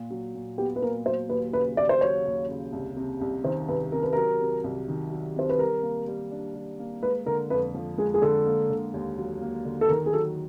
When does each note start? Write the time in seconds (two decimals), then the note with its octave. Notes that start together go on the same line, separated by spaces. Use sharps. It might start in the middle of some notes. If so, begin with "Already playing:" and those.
Already playing: A#2
0.10 F#3
0.35 A#2
0.58 B3 G4
0.76 B4
0.82 A#2 A#4
1.06 F#3 C5
1.29 D#2 B4
1.53 C#3 B4
1.77 D#2 D5
1.89 C5
2.01 F#3 C#5
2.26 D#2
2.49 C#3
2.72 C2
2.96 C3
3.21 C2
3.44 D#3 C5
3.68 C2 B4
3.92 C3 A#4
4.03 B4
4.13 F#3 A#4
4.40 C3
4.64 C2
4.88 D#3
5.11 F#3
5.36 C3 C5
5.49 B4
5.59 G3 A#4
5.83 A#3
6.08 G3
6.31 D4
6.55 G3
6.79 A#3
7.02 G#3 B4
7.26 D3 A#4
7.50 F2 B4
7.75 F3
7.98 G#3 G#4
8.14 G#4
8.21 D3 A4
8.46 A#3
8.69 D3
8.94 D#2
9.17 F#3
9.41 A#3
9.65 D3
9.81 A4
9.88 D#3 A#4
10.06 G#4
10.13 F#3 A4